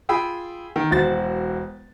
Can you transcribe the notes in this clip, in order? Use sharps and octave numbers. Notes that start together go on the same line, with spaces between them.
F4 G#4 G5 B5 E6
D#3
E1 F#4 C5 A6